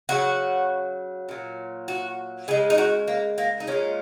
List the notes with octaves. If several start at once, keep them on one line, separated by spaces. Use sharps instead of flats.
C#3 F#3 F#4
A#2 F#3
F#4
C#3 G#3 G#4
D#4
F#4
A#3
A#3
D#4
A#2 G#3 C#4